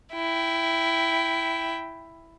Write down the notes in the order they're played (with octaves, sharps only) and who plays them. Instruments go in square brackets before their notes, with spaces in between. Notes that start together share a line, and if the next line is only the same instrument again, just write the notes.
[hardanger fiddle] E4 G5